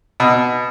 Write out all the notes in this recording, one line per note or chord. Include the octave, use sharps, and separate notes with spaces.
B2